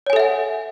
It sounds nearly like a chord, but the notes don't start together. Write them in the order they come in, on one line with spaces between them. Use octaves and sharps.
C#5 G#5 A4 E5 F#5